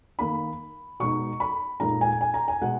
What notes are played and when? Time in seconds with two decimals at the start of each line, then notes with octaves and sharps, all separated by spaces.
0.19 D#3 A#3 D#4 B5
1.00 B2 G#3 D#4 C#6
1.40 B5
1.80 A#2 G#3 D#4 A#5
2.01 G#5
2.21 G#5
2.34 A#5
2.48 G#5
2.61 B2 G#3 B3 F#5